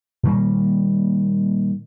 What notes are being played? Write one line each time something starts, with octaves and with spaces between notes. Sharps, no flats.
A#2 D#3 G3 A#3